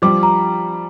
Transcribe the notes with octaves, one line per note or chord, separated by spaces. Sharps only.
F3 G3 D6
A#5